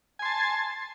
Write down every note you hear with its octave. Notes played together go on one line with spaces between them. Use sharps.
G#5 A5 C6